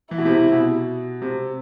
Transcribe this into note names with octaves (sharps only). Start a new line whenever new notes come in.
E3 E4
B2
C3
C3
B2
C3